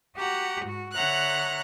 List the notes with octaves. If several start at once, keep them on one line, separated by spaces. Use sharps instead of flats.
F#4 G4 F#5 A#5
G#2 F#4
D3 C#5 E5 F#5 A#5 F#6